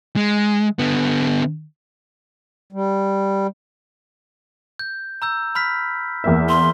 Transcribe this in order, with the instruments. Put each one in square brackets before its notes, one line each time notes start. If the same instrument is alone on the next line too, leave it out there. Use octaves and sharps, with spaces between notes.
[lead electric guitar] G#3
D3 B3
[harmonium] G3
[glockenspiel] G6
A#5 E6 G6
B5 F6 B6
[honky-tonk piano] E2 A#3 E5
[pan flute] C6